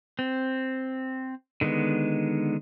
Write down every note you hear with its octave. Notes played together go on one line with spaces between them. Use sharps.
C4
D3 D#3 G#3 B3